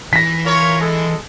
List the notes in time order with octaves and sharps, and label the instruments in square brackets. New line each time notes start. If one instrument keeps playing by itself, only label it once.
[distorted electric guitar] E3 [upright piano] A#6 B6
[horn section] F4 A#4 C#5
G#3 A4